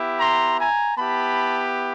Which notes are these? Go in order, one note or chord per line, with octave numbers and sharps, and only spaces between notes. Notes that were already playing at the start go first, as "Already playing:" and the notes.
Already playing: B3 E4 G4
A#5 C6
G#5 A#5
B3 E4 G4 A5 B5